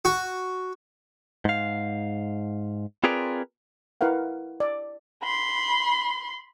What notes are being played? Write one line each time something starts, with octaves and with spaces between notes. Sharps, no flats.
F#4
G#2 F5
C4 F4 G#4 A#4 B4 D5
E4 A#4 B4 F5 F#5
D5
B5 C6